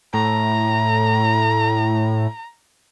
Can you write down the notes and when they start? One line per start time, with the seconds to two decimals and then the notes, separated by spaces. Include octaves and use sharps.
0.14 A2 A#5